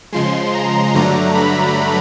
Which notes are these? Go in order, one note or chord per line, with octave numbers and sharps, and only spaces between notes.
C#3 F3 G#3 C6
A#5
G2 D3 F#3 A3 D4 A#5
B5